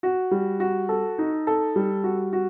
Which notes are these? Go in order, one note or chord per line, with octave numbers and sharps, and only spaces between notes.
F#4
G3
F#4
A4
D#4
A4
G3
F#4
F#4